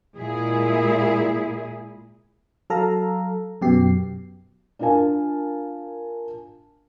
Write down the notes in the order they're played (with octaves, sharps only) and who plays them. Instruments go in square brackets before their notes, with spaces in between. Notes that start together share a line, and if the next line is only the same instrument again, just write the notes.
[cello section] A#2 G#3 E4 G#4
[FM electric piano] F#3 A4 F5 A#5
F#2 B2 G4 C7
[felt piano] D4 F4 A#4 F5 G#5 A5